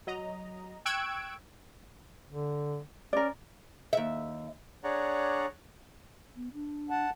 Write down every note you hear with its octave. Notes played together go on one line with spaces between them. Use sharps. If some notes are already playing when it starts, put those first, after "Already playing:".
F#3 D#5 A#5
G5 C#6 E6 F#6 G#6 D7
D3
C#4 A#4 D5
D#2 E5
D4 G#4 C#5 D5 F#5 A#5
B3
D4
F#5 A5